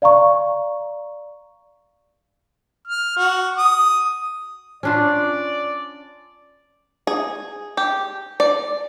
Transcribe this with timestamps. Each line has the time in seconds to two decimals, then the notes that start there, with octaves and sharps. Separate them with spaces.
0.02 D5 F5 A#5 C#6
2.87 F6
3.16 F#4
3.57 D#6
4.83 C#4 D4 F4 D5
7.07 G#4
7.77 G4
8.40 D5